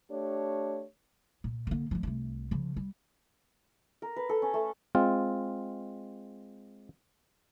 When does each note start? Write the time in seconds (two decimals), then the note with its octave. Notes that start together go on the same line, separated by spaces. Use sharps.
0.10 A3 D4 G4 C#5
1.44 A#2
1.67 D3 A#3
1.91 F3 G#3
2.03 C2 A3
2.51 C#3 F3
2.76 G3
4.02 A#4
4.16 B4
4.29 A4
4.42 C#4
4.54 A3
4.95 G#3 C4 F4